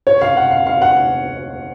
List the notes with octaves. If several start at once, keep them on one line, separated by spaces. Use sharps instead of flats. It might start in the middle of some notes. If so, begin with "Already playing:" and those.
C#5
F5
F#5
F5
F5
F#5